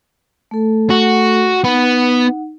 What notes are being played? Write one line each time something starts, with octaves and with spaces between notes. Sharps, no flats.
A3 A4
F#4
B3 D#4 F#5